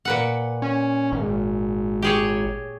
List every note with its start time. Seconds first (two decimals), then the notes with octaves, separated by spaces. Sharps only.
0.05 A#2 B4 F#5
0.62 C#4
1.12 G#1
2.02 G4 G#4 C#5